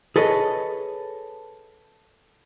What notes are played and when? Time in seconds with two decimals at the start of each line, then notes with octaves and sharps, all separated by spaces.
0.16 G#4 A4 B4 C#5 D#5